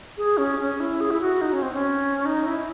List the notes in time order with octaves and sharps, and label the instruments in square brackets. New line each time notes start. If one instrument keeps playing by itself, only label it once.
[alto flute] G#4
C#4
C#4
E4
G#4
E4
F#4
D#4
C#4
C4
C#4
D#4
E4